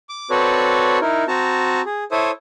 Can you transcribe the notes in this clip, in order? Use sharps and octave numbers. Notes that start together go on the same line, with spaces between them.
D6
C4 F#4 A4 B4 C#5 D5
D#4 E4 A#4
C4 F#4 A5 A#5
G#4
E4 A4 C5 C#5 E5 D#6